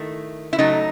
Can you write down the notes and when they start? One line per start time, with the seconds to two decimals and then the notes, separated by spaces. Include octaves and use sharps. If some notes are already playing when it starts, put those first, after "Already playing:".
Already playing: D#3 A3 E4
0.53 E4
0.58 C#3 F#3 A3 D#4